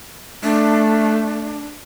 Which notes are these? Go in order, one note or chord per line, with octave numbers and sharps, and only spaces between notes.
A3 D4